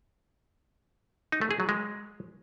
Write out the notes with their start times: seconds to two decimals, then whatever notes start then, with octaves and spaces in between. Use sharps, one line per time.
1.32 D#4
1.41 A3
1.51 G#4
1.60 F#3
1.69 G#3